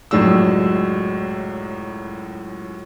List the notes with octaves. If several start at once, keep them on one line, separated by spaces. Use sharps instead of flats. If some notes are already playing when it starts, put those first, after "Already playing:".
C#2 F#2 A2 G#3 D4 E6